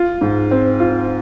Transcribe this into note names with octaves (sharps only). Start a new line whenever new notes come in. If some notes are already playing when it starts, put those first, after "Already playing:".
Already playing: F4
G#2
C4
F4